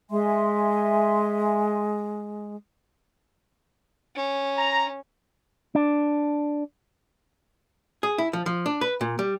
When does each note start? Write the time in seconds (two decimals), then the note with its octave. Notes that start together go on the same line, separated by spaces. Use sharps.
0.11 G#3 E5 G#5 C6
4.15 C#4
4.57 A#5
5.75 D4
8.03 G#4
8.18 E4
8.33 F3
8.46 F3
8.66 D4
8.81 B4
9.01 A#2
9.19 G3